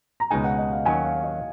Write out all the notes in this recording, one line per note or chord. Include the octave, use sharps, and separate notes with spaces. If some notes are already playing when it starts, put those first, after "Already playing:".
A#5
C#2 B2 G#3 D#4 G#5
F#5
D#5
F5
D#2 D#3 F#3 C#4 G#5
F5
D#5